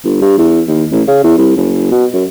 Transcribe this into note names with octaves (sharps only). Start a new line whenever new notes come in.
G1
G2
E2
D#2
A1
C#3
E2
C2
F#1
B2
F#2